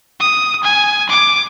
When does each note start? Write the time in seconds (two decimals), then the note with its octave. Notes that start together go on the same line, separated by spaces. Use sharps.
0.20 D#6
0.63 G#5
1.09 D6